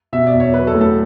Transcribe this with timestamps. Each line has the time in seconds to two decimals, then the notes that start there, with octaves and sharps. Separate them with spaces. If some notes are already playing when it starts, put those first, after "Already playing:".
0.13 B2 E5
0.27 D5
0.33 E2
0.40 C#5
0.53 F#3 B4
0.67 A4
0.74 A2
0.81 A4